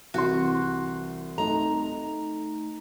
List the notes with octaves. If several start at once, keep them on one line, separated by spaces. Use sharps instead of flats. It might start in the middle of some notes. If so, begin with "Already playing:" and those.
C2 E3 F#4 C6
A3 D#4 A#5